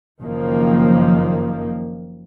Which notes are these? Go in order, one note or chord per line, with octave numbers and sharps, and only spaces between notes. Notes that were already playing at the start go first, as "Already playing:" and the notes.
F#1 D#3 F3 A#3